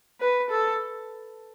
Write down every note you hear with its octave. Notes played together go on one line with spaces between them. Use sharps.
B4
A4